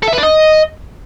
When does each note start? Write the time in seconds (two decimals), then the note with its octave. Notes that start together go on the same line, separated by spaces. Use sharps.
0.03 A4
0.08 E5
0.13 B4
0.18 D4
0.23 D#5